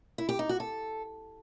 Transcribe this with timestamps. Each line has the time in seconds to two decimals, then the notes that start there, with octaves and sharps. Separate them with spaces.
0.18 E4
0.29 G4
0.39 D#4
0.49 F#4
0.60 A4